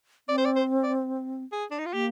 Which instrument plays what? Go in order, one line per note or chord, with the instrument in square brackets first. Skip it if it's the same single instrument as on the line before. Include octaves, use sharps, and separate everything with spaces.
[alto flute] C4 [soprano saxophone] D5
[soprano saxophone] C5
D5
C5
D5
G#4
D4
D#4
F4
[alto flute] A#3 [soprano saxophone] G4